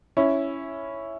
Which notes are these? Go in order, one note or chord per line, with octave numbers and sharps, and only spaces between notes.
C#4 E4